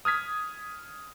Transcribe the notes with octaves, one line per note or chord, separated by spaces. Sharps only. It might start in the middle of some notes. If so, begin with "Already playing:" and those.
D#6 F6 G#6 B6